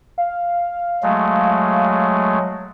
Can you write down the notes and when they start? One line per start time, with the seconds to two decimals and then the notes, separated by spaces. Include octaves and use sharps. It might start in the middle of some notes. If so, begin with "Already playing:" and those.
0.18 F5
1.03 F#3 G#3 A3